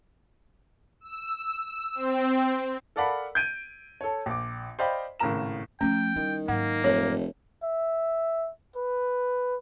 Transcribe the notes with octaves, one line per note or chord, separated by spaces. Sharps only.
E6
C4
A4 A#4 D5 F5 F#5 B5
G6 G#6 D7 D#7
A4 C#5
A#1 D6
C5 D5 D#5 F5 G5 B5
G#1 A2 C#3 A#4 A#5 E7
F3 A3 C#4 G5
D#3 G3 E4
G#2 F#3 A#3 F#5
F1 A#4 C#5
E5
B4